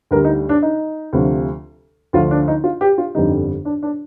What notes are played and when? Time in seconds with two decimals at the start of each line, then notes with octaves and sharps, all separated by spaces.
0.11 D2 D3 G3 A#4
0.25 D#4
0.49 D4
0.62 D#4
1.13 D2 C3 F3
2.13 D2 D3 F3 F4
2.31 D4
2.48 D#4
2.64 F4
2.81 G4
2.98 F4
3.15 G1 F2 D3 G3 D#4
3.65 D4
3.83 D4